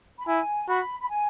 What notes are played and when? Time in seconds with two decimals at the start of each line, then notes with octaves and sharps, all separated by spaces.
0.19 B5
0.27 E4 G#5
0.68 F#4 B5
1.01 B5
1.10 G#5